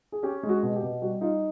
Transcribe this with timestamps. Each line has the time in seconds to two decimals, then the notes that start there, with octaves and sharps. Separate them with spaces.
0.12 G#4
0.23 C#4 G4
0.43 G#3
0.49 F#4
0.63 B2
0.76 G4
0.82 B2
1.02 G3 F#4
1.21 D#4 F4